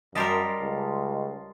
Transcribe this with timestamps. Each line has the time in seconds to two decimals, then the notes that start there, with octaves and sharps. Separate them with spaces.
0.15 F#2 G3 G4 A#4 D#5 A5 C6
0.61 C#2